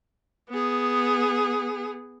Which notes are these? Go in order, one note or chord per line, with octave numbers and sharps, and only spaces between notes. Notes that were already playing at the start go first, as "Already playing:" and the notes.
B3 G#4